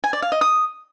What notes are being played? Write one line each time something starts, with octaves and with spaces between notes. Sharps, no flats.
G#5
D5
F5
D#5
D#6